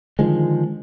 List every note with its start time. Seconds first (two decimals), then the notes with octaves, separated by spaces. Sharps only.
0.19 D3 D#3 F3 G#3